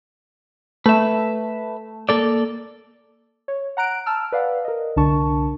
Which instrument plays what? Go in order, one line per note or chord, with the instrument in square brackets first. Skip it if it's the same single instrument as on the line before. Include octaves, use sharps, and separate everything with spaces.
[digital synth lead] A3 [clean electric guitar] B4 E5
[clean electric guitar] A#3 A4 D5
[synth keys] C#5
F#5 A#5 F#6 D7
A5 E6 F6
B4 D5 F5 F#5
A#4 D#5
C2 D3 D4 A#4 A5 C#6